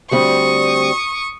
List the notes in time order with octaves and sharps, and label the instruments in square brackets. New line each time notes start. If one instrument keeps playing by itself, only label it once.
[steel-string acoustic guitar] D2 G3 C4 [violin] C#6 D#6